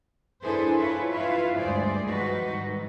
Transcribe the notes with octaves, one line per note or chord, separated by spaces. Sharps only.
D4 E4 G#4 A4 B4 C5
E4 F4 A#4 B4 C#5 E5
E4 F4 B4 C#5 E5 F5
D2 G2 G#3 G#4 C5 D5
D#3 F3 G3 D#4 F#4 B4
G#2 D#3